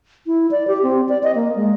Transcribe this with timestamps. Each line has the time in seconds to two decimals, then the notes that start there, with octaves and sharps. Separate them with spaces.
0.27 E4
0.51 D5
0.68 G4
0.83 C4
1.09 D5
1.23 D#5
1.35 A#3
1.56 G#3